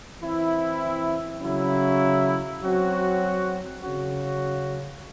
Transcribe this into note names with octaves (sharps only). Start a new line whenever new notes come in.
E3 C4 E4
C#3 F#3 C#4 E4
F#3 C4 F#4
C#3 F#3 C#4 F#4